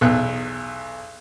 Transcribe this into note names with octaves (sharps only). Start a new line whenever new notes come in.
B1 E2 F#6